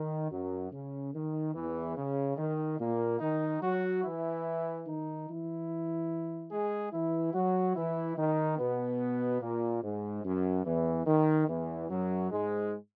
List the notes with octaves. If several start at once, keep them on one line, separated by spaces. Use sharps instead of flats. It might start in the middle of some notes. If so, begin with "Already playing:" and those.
Already playing: D#3
F#2 F#3
C#3
D#3
E2 E3
C#3
D#3
A#2 A#3
D#3 D#4
F#3 F#4
E3 E4
D#3 D#4
E3 E4
G#3 G#4
E3 E4
F#3 F#4
E3 E4
D#3 D#4
B2 B3
A#2 A#3
G#2 G#3
F#2 F#3
E2 E3
D#3
E2 E3
F#2 F#3
G#2 G#3